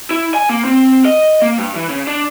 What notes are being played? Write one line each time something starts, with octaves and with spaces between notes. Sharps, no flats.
E4
G#5
A#3
C4
D#5
A#3
G2
E3
C#3
D4